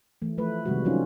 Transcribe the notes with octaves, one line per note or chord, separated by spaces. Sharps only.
E3 A3
F3 A3 B4
C3 D#3 G3 G#3 F#4
F3 F#3 C4 C#4 D#4 F4